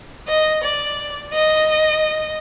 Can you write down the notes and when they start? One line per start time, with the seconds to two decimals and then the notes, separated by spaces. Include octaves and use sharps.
0.28 D#5
0.64 D5
1.33 D#5